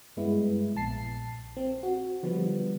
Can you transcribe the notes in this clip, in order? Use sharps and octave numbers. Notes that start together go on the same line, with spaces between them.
G2 G#3 B3 E4
A#1 A5 C7
C4
F#4
D3 F3 G3 B3